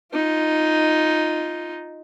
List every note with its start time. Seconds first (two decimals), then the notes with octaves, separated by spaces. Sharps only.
0.13 D#4 F4